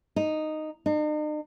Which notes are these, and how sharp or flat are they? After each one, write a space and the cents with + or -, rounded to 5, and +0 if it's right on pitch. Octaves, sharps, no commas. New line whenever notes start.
D#4 -5
D#4 -45